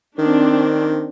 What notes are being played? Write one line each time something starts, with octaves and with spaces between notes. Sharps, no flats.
D#3 C4 D4